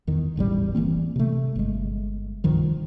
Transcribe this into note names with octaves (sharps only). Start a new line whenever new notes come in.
E2 D#3
E1 A1 E2 G3
E3 F#3 A#3 C4
C3 A3
G1 G#3
C2 G2 D#3 F3